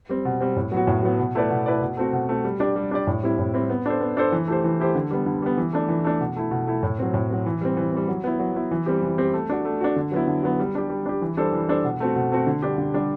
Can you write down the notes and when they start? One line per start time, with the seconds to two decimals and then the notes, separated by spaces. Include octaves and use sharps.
0.09 G3 C4
0.25 B2
0.40 G3 C4
0.57 A2
0.72 F#3 B3 F#4
0.87 A2
1.03 F#3 B3 F#4
1.19 B2
1.35 A3 E4 B4 D5
1.50 B2
1.66 A3 E4 B4 D5
1.81 B2
1.97 A3 C4 F#4
2.13 B2
2.29 A3 C4 F#4
2.44 G3
2.60 D4 G4 D5
2.76 G3
2.91 D4 G4 D5
3.07 A2
3.23 G3 C4 E4
3.39 A2
3.54 G3 C4 E4
3.69 B3
3.86 D4 A4 C5
4.01 B3
4.17 D4 A4 C5
4.32 E3
4.48 A3 E4 G4 C5
4.64 E3
4.80 A3 E4 G4 C5
4.95 D3
5.11 G3 B3
5.26 D3
5.42 G3 B3
5.58 E3
5.73 A3 D4
5.88 E3
6.04 A3 D4
6.20 B2
6.36 A3 E4
6.51 B2
6.67 A3 E4
6.83 A2
6.99 F#3 C4
7.14 A2
7.30 F#3 C4
7.46 E3
7.61 G3 C4
7.77 E3
7.92 G3 C4
8.08 F#3
8.24 B3 E4
8.39 F#3
8.55 B3 E4
8.71 E3
8.86 G3 C4 G4
9.03 E3
9.18 G3 C4 G4
9.33 A3
9.49 D4 F#4
9.65 A3
9.81 D4 F#4
9.96 D3
10.12 F#3 B3 E4
10.27 D3
10.43 F#3 B3 E4
10.59 G3
10.75 D4 G4
10.90 G3
11.06 D4 G4
11.22 E3
11.37 G3 D4 A4 C5
11.53 E3
11.68 G3 D4 A4 C5
11.84 B2
12.00 A3 C4 F#4
12.16 B2
12.32 A3 C4 F#4
12.47 D3
12.62 G3 D4 G4
12.78 D3
12.94 G3 D4 G4